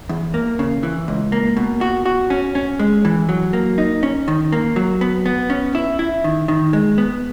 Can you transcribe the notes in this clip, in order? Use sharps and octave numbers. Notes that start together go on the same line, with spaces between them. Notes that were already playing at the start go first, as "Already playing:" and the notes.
E2
A#3
C#3
E3
C#2
A#3
B2
F#4
F#4
C#4
C#4
G#3
E3
F#3
A#3
D#4
C#4
D#3
A#3
F#3
B3
B3
C#4
E4
E4
D#3
D#3
G#3
B3